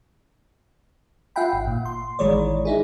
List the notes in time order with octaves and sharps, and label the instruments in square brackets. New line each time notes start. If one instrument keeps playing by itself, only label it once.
[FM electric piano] F4 E5 F#5 G5 B5
G#1
A#2
C6
A1 D#3 E3 G#3 C#5 D5
D#4 E4 G#4